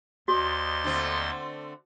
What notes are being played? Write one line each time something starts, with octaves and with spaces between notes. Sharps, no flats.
D#2 F#4 C5 D5 D#5 C6 A6
D3 A3 C4